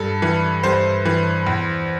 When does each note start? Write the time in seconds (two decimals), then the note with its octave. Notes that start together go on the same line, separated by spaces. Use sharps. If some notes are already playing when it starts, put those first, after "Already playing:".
Already playing: G2 A4
0.22 E3
0.63 G2 C5
1.05 E3
1.47 E2